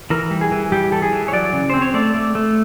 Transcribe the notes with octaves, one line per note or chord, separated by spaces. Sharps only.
E3 A#4
G3
G#4
E3
G3 G4
E3 A4
G#4
E3
C#5
F#3 D5
C#3
C4 C5
C#5
A3 D5
A3
A3